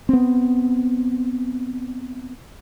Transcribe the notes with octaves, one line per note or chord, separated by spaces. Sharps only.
B3 C4